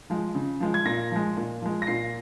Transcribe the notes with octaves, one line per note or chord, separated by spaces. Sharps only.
F3 G#3
C#3
F3 G#3
G#6
A#2 A#6
F3 G#3
A#2
F3 G#3
A#6
A#2 C7